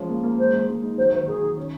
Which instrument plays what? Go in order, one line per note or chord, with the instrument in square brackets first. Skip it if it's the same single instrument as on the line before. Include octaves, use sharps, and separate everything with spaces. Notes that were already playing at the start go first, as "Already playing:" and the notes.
Already playing: [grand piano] F3 G#3 C#4
A#3
A#3
[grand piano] G#3 [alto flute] C5
[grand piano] G#3
G#3
D#4
[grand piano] F#3 [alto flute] C5
[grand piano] D#3 [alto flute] C5
[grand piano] D#3 [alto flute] G#4
[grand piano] D#3
C#4